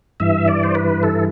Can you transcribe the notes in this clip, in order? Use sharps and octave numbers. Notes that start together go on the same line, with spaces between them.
G2 E3 E5
D5
C5
B4
A4